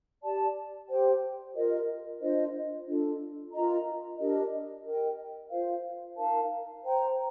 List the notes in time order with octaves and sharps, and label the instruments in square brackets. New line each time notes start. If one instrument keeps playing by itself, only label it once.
[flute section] G4 D5 A5
G4 C5 G5
F4 A#4 D#5
D4 F4 C5 D#5
D4 F4 A4
F4 A#4 D#5 A#5
D4 G4 A#4 D#5
A#4 D#5 G5
F4 C5 F5
D#4 A#4 F5 A5
C5 G5 A#5